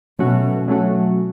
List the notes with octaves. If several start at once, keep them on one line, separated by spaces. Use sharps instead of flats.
B2 F#3 A3 C#4 F#4
F#3 A3 C#4 F#4